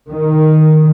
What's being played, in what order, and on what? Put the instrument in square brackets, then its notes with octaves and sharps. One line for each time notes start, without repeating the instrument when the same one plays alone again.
[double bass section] D#3